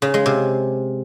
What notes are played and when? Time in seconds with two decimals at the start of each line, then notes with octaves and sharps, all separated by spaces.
0.02 C#3
0.14 G#3
0.26 C3